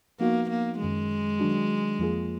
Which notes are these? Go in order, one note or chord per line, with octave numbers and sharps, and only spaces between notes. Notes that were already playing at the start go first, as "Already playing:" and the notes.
F3 A#3 B3 D#4 F#4
A#3
F#2 D#3 F#3 G#3
D#3 F#3 D4 F#4
F2 F3 A#3 F4 G#4